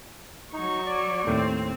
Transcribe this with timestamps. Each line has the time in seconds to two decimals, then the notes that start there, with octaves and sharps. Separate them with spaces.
0.53 F#3 D#4 C#6
0.86 D5
1.27 D#2 A2 C4